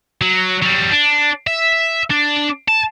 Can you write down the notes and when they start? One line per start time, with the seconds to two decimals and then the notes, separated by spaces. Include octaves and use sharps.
0.22 F#3
0.63 F#3 G3
0.92 D4
1.47 E5
2.10 D4
2.68 A5